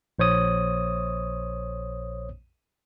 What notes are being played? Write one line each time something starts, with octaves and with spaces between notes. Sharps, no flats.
A#1 C5 C#5 D#6